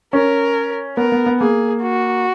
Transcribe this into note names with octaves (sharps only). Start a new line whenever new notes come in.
C#4 A#4
B3 A#4
B3
B3
A#3 G#4
F#4